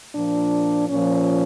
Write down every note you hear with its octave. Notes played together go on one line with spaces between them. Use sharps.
A#2 F3 D4
A#2 F3 C#4